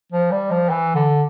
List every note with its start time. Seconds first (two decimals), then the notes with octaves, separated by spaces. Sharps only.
0.12 F3
0.31 G3
0.51 F3
0.69 E3
0.95 D3